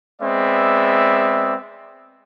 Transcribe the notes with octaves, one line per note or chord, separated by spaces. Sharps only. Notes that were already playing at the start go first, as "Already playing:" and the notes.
G#3 B3 C4 D5 E5